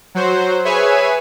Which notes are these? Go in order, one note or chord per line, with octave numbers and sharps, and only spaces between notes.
F#3 F#4 C5
G#4 B4 C#5 E5 G#5